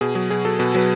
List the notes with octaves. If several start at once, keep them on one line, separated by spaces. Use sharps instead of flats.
B2 G#4
F#3 G#4
B2 G#4
F#3 A4
B2 B4
F#3 B4